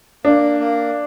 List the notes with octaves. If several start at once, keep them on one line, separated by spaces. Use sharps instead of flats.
A#3 D4
A#3